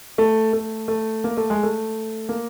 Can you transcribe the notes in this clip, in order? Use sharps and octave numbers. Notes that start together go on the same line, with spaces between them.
A3
A3
A3
A#3
A3
G#3
A3
A#3